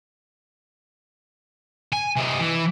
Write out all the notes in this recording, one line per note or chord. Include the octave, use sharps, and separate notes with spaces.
G#5
C3 D#5
E3